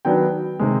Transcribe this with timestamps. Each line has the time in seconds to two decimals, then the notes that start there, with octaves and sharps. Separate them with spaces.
0.05 D#3 F#3 B3 D4 G5
0.59 C3 D#3 G#3